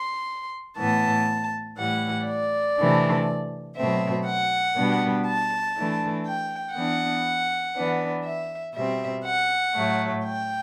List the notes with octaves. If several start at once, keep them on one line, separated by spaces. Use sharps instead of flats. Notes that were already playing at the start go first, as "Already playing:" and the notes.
Already playing: C6
A2 E3 B3 A5
A2 E3 G3 F#5
D5
C3 E3 A3 D4
B2 F#3 A3 C4 E5
F#5
B2 G3 B3 D4
A5
E3 A3 D4
G5
E3 B3 D4 F#5
E3 B3 D4
E5
B2 G3 C4 E5
F#5
A2 F#3 A3
G5